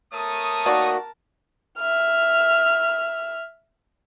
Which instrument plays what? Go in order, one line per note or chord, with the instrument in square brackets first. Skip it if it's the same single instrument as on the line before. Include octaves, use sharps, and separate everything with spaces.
[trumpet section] A3 C#5 D#6 [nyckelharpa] A#4 A5
[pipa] D#3 A#3 D5 [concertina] F#4
[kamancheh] E5 F6